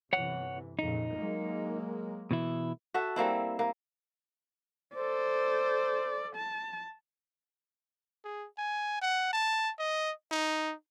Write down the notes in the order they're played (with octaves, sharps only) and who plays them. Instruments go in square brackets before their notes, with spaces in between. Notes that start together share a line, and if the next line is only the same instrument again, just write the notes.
[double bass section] G1 C3 E3 [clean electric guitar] C#5 F#5
[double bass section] F2 A#2 C#3 [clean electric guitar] D#4
[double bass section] F#3 G#3 A#3
[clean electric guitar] B2 E3 E4
[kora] F#4 A4 E5
G3 A#3 C4 E4
A#3
[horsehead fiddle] A4 D5 [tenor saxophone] C5
[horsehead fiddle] A5
[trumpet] G#4
G#5
F#5
A5
D#5
D#4